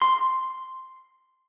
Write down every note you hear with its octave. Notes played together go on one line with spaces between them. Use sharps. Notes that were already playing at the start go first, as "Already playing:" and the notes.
C6